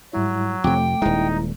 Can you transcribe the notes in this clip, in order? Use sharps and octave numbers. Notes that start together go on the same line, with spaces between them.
G#2 F#3 G3 E4
F2 C3 A3 G5 D6
D#1 G#3 D#4 E4